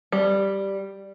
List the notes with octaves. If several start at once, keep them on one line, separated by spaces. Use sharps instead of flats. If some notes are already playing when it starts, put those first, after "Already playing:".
G3